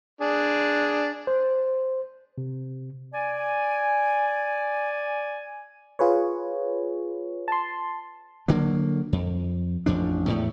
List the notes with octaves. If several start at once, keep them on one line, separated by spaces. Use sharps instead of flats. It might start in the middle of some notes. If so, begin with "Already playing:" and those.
D4 G#4
C5
C3
D5 G#5
F4 G#4 B4 C#5
A5 C6
D3 F#3 A#3
F2
A1 F2 F3 D4
E2 A2 A3